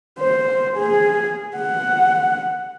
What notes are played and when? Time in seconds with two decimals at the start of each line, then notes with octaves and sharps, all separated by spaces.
0.20 C5
0.76 G#4
1.57 F#5